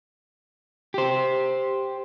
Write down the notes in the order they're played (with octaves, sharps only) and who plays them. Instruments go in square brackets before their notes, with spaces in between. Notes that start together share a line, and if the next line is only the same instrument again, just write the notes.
[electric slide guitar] G4 C5